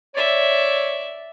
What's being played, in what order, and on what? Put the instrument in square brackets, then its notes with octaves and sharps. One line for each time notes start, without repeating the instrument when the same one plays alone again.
[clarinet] C#5 [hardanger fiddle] D5 E5